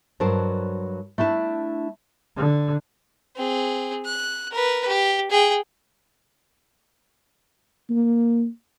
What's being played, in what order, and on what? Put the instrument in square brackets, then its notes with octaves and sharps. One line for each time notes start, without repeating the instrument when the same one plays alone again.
[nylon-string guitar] G2 F#3 F#4 A#4 C5 A5
A3 D4 E4 A5
[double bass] D3
[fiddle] C4 G#4
F#6
A#4 B4
G4
G#4 G5
[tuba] A#3